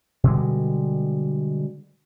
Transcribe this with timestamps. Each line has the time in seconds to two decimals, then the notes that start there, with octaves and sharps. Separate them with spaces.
0.24 B2 D3 G3 G#3